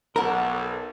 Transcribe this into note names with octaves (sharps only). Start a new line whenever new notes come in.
B1 A4 A#4 F#5